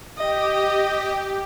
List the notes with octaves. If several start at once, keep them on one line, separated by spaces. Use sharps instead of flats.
G4 D#5